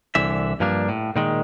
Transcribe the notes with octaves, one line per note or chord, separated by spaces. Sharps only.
C2 D3 E3 E5
G2 F3 A#3 D4
A2
A#2 D#3 G#3